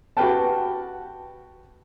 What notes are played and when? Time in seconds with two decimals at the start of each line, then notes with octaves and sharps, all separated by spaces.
0.17 F#4 G4 B4 G5 A5